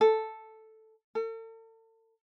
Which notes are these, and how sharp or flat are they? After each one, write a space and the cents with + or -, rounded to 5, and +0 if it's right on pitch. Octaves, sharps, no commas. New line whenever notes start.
A4 +0
A4 +40